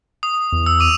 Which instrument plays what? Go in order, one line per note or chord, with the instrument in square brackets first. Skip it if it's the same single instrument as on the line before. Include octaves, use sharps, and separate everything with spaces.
[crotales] D#6
[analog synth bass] E2
[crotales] E6
D6 D#7 F7